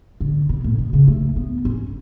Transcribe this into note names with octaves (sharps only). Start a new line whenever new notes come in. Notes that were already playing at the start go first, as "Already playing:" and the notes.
D3
B2
A2
B2
C#3
A3
B3
C#4